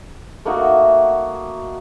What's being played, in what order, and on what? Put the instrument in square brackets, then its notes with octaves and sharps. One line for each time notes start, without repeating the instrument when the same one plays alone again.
[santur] A3 A#3 D#4 F#4